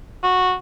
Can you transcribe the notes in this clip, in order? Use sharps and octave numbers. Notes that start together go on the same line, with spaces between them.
F#4